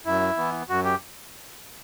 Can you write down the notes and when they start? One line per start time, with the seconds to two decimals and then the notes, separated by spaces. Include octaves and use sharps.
0.05 F#2 E4
0.37 E3 B3
0.69 F#2 F#4
0.84 G4